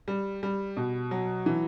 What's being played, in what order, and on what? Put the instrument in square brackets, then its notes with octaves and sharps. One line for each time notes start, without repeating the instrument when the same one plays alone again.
[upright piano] G3
G3
B2
F#3
E3